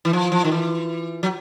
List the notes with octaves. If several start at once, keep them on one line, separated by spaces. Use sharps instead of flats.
E3
F3
F3
D#3
E3
F#3